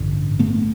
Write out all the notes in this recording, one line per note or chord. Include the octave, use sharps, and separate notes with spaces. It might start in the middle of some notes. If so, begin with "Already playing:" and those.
Already playing: A1 G2 D3
A3 B3